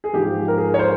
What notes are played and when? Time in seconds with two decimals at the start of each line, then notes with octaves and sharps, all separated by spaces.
0.04 G#4
0.13 G#2 F3 G4
0.48 A#4
0.58 G#4
0.68 A#4
0.74 C#5
0.79 C5